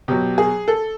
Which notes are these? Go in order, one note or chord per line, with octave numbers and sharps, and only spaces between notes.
B2 F#3 G4
G#4
A4